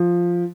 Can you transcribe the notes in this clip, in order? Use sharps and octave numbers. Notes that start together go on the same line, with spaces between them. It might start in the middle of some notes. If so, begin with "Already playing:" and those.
Already playing: F3